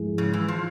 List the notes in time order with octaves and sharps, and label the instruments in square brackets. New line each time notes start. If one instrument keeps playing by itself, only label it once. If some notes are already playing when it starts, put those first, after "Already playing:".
Already playing: [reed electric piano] G#2 F3 G#3 E4 G#4
[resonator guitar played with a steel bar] C#3
E3
F3